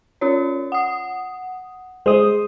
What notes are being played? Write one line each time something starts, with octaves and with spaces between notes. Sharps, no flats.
C#4 F4 C#5
F#5 D#6
G#3 C5 D#6